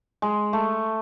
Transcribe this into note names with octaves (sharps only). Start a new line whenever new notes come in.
G#3
A3